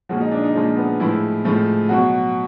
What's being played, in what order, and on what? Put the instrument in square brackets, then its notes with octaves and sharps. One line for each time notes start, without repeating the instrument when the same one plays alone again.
[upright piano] A#2 F3 G#3 F#4
D#4
D4
D#4
A#2 F3 G#3
B3
A2 F3 G#3 E4
A2 F3 G#3
B2 F#3 F#4